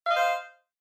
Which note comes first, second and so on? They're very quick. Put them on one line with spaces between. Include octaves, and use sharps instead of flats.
F5 D#5 C5